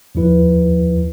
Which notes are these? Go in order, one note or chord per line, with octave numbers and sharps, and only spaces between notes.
D#2 F3 E4 B4